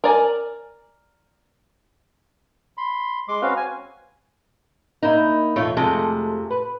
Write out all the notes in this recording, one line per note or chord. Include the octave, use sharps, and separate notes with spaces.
A#4 D5 G#5
B5 C6
G#3 C6 D6
C4 C#4 F#4 B4 F5
G#5
A#3 D#4 E4
E2 B2 A3 F4 C#5
F2 C3 G#3 A3 F4 A4
B4